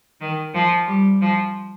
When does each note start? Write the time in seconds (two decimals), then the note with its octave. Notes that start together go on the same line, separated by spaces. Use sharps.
0.21 D#3
0.54 F3
0.87 G3
1.21 F3